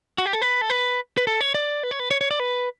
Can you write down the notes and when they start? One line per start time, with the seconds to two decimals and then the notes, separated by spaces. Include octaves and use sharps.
0.18 F#4
0.26 G4
0.33 A4
0.42 B4
0.61 A4
0.70 B4
1.17 B4
1.27 A4
1.41 C#5
1.55 D5
1.83 B4
1.91 C#5
1.99 B4
2.11 C#5
2.21 C#5
2.31 D5
2.40 B4